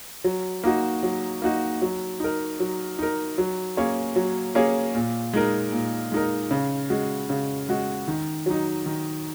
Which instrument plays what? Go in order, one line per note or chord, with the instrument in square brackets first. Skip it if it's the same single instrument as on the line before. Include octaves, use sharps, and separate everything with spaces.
[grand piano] F#3
A#3 D#4 F#4
F#3
A#3 D#4 F#4
F#3
D#4 A#4
F#3
D#4 A#4
F#3
A#3 C#4 G#4 C#5
F#3
A#3 C#4 G#4 C#5
A#2
G#3 D#4 A#4
A#2
G#3 D#4 A#4
C#3
G#3 F#4
C#3
G#3 F#4
D#3
F#3 D#4
D#3